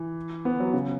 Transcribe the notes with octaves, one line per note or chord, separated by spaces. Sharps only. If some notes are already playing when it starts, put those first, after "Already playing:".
Already playing: E3
B3
F#3
C#3